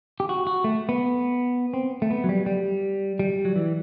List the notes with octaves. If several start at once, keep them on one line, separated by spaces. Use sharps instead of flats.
G4
F#4
F#4
A3
B3
C4
A3
B3
F#3
G3
G3
G3
F#3
E3